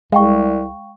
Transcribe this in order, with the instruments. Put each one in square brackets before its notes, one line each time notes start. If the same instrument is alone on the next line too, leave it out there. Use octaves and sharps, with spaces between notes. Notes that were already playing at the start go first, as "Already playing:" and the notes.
[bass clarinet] C2 [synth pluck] G#3 [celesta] F5 G5 C#6